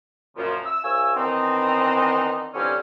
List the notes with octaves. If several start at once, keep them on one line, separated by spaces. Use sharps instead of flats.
F#2 A#2 C#3 F3
E6
C2 C#5 F5 G#5 E6
D#3 E3 B3 C4 D4 D#4
D3 E3 F3 G3 C4 C#4